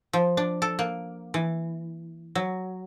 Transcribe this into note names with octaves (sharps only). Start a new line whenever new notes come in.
F3
D4
A4
A#3
E3
F#3